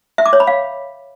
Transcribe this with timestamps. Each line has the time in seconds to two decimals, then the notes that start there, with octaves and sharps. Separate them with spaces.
0.18 E5
0.26 D6
0.33 C#5
0.40 B5
0.47 F5